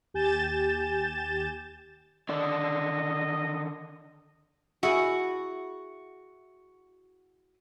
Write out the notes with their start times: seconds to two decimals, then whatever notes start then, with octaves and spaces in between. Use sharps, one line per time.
0.14 D#2 G4 G#5 G6 A6 E7
2.29 D3 D#3 D5 D#5
4.83 E4 F#4 G#4